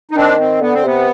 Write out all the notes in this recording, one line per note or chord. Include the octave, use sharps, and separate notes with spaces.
D#4
D#3 C4 D4
C4
D3 B3
C4
C3 B3